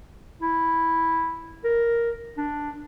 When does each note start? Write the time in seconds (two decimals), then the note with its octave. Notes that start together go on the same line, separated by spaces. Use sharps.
0.42 E4
1.64 A#4
2.38 D4